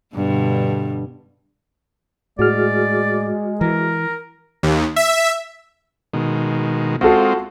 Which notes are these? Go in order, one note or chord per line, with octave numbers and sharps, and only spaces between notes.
G2 B2 D3
A2 G#3 F#4 G#4 D5 F6
E3 A#4
D#2
E5
B2 D#3 G#3
G#3 C4 F4 F#4 A4